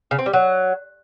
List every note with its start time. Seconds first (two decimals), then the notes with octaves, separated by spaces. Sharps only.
0.11 C#3
0.19 C4
0.26 G3
0.33 F#3